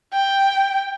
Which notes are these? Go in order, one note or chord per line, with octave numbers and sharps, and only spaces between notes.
G5